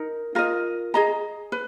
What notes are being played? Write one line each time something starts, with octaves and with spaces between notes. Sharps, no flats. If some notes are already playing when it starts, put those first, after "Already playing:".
Already playing: D#4 A#4
F4 A#4 D#5
G#4 D#5 A#5
B4